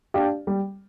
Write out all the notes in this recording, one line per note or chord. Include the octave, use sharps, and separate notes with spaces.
D4 G4 D5 F5
G3